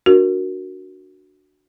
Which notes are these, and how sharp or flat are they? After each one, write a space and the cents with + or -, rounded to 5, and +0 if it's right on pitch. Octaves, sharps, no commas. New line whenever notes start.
D4 +5 F#4 +0 A#4 +0